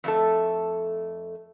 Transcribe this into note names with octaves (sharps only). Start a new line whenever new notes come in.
F2 A3 A4